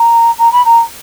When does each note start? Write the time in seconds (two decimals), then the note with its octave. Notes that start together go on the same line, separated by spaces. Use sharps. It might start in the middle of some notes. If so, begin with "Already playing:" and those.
Already playing: A#5
0.39 A#5
0.52 B5
0.65 A#5